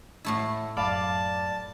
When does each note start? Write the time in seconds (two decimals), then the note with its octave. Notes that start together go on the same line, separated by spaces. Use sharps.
0.25 A2 A3 E4
0.77 F#2 D5 F5 A5 B5